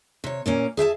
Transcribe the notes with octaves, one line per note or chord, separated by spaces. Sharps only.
C3 C#5
A#2 A#3 C#4
G#4 E5 G5 A5